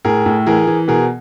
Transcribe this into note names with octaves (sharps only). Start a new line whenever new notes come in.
A2 G#4 A#4
A2
E3 G#4 A#4
E3
B2 G#4 A#4